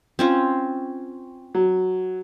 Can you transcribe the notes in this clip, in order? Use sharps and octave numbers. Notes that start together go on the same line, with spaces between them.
C4 C#4 F4
F#3